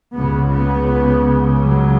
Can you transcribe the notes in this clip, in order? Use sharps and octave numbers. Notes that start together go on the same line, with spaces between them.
C#2 C#3 B3
B3
F#3